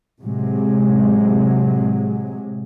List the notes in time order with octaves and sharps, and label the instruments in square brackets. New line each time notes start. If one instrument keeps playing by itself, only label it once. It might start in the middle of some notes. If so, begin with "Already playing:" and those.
[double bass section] A2 C3 F#3 G#3